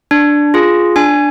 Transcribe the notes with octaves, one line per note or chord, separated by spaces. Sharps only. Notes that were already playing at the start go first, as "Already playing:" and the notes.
D4
F4 G#4
D4 G#5